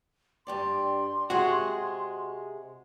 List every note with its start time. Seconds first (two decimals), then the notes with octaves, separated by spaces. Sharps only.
0.47 G2 G4 D5 C6
1.30 C3 G#3 F#4 G#4